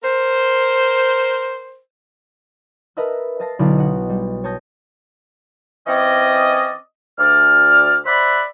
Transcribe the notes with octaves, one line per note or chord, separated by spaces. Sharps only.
A#4 C5
A#4 B4 D#5 E5 A5 E6
D#5 F5 A5 A6 A#6 C7
B1 D3 E4 D5 F5
D#5 F#5
G3
C#5 A5 D#6 G6 A#6
E3 C4 C#4 D5 D#5
D2 D5 F6
C5 D5 E5 F#5 B5